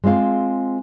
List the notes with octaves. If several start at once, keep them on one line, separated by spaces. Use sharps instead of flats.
G#3 C4 F4 F5